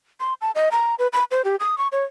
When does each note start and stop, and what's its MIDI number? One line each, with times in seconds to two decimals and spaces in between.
0.20 0.34 84
0.41 0.51 81
0.55 0.69 75
0.71 0.95 82
0.99 1.07 71
1.13 1.24 83
1.31 1.42 72
1.45 1.56 67
1.60 1.78 87
1.78 1.88 85
1.92 2.04 73